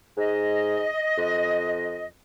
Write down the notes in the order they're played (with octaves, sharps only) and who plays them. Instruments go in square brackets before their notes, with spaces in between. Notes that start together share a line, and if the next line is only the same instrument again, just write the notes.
[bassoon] G#2 [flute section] D#5
[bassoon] F2